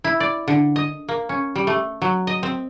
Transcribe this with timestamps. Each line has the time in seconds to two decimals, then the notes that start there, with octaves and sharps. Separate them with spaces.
0.04 E4
0.20 D5
0.48 D3
0.76 D#5
1.09 A#3
1.29 C#4
1.56 G3
1.67 A3
2.02 F#3
2.27 D#5
2.43 C4